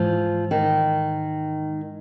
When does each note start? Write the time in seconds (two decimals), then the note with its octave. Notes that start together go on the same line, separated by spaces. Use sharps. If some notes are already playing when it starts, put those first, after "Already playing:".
Already playing: G#2 E3 F3 G#3
0.51 D#3